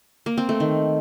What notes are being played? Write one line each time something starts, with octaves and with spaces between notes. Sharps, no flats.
A#3
C4
A3
D#3